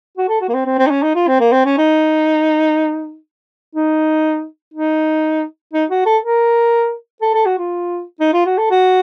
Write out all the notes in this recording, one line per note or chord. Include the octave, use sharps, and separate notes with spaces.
F#4
A4
F#4
A#3
C4
C4
C4
D#4
C#4
D#4
F4
C4
A#3
C4
C#4
D#4
D#4
D#4
D#4
F#4
A4
A#4
A4
A4
F#4
F4
D#4
F4
F#4
A4
F#4